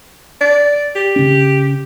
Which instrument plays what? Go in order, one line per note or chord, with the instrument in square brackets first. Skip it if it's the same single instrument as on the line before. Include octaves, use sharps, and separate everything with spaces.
[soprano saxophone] D5
G4
[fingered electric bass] C#3 C#4